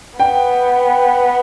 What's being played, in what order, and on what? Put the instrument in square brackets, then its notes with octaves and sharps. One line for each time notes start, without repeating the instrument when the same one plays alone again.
[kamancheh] B3 [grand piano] G5